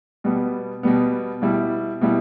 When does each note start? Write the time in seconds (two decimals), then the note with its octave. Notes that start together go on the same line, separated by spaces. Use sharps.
0.24 B2 G3 B3
0.83 B2 G3 B3
1.42 B2 G3 E4
2.01 B2 G3 E4